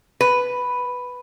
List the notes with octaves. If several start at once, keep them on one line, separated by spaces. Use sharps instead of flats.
B4